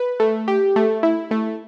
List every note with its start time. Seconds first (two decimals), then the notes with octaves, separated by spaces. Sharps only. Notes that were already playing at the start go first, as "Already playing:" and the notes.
Already playing: B4
0.20 A3
0.48 G4
0.76 A3
1.03 E4
1.31 A3